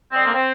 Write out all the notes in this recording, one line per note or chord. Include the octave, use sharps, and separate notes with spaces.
D3 G#3 C4
A#3
C4